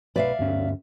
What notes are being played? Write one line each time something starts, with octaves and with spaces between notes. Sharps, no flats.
B1 B4 D5 E5 F5
D2 G2 C#4